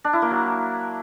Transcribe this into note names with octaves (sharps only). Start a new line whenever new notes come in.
D4
E4
A#3
F#3